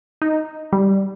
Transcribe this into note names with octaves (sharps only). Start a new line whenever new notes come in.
D#4
G3